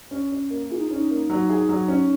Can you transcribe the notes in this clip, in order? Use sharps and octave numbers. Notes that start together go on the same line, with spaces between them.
C#4
C#4
A#3
F4 G#4
D#4
C#4 D#4
A#3
F#3
G#4
F#3
C#4